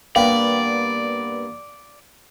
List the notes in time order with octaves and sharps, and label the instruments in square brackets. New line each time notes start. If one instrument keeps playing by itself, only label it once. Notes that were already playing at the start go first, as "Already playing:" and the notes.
[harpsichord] G2 A#3 B3 [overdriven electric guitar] D5 [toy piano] F5 G5